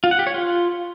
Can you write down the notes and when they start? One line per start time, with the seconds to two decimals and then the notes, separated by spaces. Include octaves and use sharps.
0.04 F4
0.11 F#5
0.19 G4
0.27 C#5
0.34 F4